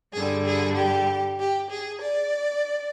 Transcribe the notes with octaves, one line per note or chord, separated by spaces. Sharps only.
G2 D3 G3 G#4
G#4
G4
G4
G#4
D5